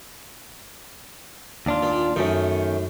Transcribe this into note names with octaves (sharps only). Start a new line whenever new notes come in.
D#2 D4 F4
A#2
F#2 D#3 A3 C#4